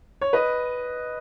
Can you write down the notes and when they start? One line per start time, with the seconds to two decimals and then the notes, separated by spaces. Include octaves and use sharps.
0.21 C#5
0.33 B4 D#5